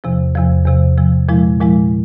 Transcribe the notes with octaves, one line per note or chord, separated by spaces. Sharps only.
E2 C3 F3
E2 C3 F3
E2 C3 F3
E2 C3 F3
A#2 F3 G#3 E4
A#2 F3 G#3 E4